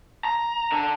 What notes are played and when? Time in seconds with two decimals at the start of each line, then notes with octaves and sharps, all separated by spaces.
0.25 A#5
0.72 D3